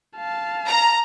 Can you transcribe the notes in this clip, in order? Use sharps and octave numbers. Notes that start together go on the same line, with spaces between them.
F5 A5
A#5